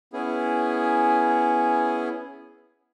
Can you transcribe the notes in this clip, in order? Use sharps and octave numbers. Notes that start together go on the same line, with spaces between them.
B3 C#4 E4 G#4